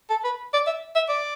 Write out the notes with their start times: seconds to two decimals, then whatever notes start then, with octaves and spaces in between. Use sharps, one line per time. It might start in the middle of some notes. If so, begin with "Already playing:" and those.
0.10 A4
0.24 B4
0.53 D5
0.67 E5
0.95 E5
1.09 D5